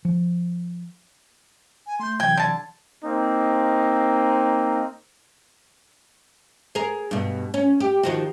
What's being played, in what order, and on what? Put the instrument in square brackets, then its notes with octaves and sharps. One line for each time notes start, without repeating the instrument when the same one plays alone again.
[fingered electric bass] F3
[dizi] G#5
[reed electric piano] A3 G6 [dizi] C6
[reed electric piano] C3 E3 F#3 [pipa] G5 [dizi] G#6
[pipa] D3 A5
[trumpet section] A#3 C4 D#4
[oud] G#4 A#4
G2 B2
C#4
G4
D#3 F3 F#4